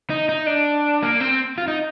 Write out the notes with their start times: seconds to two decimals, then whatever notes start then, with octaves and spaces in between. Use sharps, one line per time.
0.10 D#4
0.29 D#4
0.47 D4
1.03 A#3
1.20 C4
1.58 F4
1.68 D#4